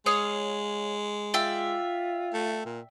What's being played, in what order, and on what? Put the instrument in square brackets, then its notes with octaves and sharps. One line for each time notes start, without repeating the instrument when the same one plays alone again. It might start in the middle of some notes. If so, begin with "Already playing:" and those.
[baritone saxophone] G#3 [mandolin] C#5 F5 D#6
[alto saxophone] F4 [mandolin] D5 E5 G5
[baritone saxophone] A3
A#2